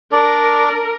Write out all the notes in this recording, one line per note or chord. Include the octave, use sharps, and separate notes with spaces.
D4 A#4 D5